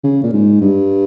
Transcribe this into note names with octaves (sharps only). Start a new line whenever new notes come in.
C#3
A#2
G#2
G2